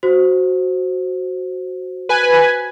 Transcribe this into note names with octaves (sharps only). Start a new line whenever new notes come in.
F#4 C5
B4 G#5